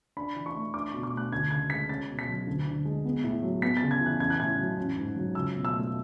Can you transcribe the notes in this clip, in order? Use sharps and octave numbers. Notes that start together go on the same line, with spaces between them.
D4 B5
E3
C#6
A3
D4 D6
C#6
B2
D6
A3 F#6
D2 G#6
C#3 G#6
G#3 B6
C#4 A6
B2
B6
F#3
D2
D3
G#3
B3
A2
F#3
B3 B6
C#3 A6
G#6
E3
F#6
A1 G#6
F#6
A2 G#6
F#3
A1
G#2
F#3
C#2 E6
B2
E6
A3